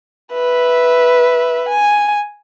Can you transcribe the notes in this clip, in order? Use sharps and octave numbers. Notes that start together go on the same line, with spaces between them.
B4 E5
G#5